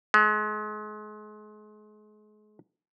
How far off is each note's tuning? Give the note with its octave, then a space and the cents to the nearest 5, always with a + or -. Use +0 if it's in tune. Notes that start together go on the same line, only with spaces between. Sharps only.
G#3 +35